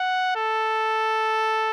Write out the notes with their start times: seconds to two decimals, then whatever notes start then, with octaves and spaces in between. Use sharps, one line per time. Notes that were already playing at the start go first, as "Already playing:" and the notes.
Already playing: F#5
0.36 A4